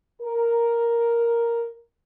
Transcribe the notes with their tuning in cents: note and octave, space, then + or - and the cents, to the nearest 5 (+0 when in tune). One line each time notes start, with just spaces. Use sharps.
A#4 +0